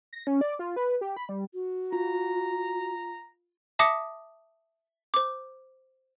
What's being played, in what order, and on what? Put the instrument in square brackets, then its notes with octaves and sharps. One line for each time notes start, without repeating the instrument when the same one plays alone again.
[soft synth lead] A#6
C#4
D5
F4
B4
G4
B5
G3
[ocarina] F#4
[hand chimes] F4 [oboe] A#5
[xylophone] E5 A5 D6 D#6 A#6 C#7
C5 D6